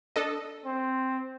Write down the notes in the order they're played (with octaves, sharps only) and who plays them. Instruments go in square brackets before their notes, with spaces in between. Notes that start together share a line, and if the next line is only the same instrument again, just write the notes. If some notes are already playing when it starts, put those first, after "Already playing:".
[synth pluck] D4 A4 D#5
[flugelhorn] C4